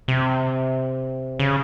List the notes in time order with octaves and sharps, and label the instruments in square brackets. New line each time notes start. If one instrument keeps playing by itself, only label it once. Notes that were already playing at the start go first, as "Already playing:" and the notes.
[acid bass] C3
C#3